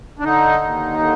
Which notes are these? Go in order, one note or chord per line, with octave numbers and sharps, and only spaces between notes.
D4
D3 D#4
D#2
D3